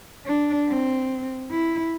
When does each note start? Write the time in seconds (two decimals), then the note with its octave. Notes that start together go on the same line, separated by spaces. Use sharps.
0.26 D4
0.68 C4
1.51 E4